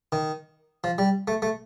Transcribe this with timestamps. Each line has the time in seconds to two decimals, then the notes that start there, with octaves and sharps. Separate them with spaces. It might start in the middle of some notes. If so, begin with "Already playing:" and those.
0.12 D#3
0.84 F3
0.98 G3
1.28 A3
1.42 A3